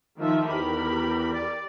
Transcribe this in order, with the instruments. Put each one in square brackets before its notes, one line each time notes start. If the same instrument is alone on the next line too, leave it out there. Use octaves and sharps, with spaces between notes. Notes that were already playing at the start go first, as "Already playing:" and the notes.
[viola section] D#3 F3 E5
[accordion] E2 B5 [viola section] G4 A#4
[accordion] D5